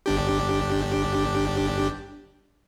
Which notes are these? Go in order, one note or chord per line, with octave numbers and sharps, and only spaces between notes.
G1 D4 G4